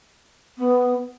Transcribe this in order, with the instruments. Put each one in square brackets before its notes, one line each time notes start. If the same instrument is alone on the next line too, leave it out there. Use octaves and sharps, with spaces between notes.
[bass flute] B3